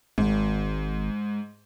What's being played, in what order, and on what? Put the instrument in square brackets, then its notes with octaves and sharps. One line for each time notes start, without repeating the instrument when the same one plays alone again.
[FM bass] G#1 [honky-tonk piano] G#2